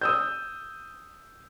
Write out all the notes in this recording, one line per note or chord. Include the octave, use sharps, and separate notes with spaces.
D#6 E6 G6